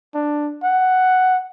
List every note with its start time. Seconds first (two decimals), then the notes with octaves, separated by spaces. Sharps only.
0.14 D4
0.64 F#5